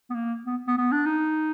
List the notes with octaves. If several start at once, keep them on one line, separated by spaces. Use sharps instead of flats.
B3
A#3
B3
B3
B3
D4
D#4